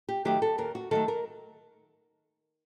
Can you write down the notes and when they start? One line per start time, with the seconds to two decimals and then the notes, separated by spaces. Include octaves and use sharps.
0.09 G4
0.25 D#3 F#3 A3 G4
0.42 A4
0.58 D#2 A#4
0.75 F#4
0.91 D#3 F#3 A3 A4
1.08 A#4